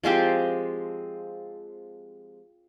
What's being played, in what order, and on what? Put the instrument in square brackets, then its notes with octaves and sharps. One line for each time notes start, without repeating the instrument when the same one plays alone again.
[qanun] F3 G#3 C4 G4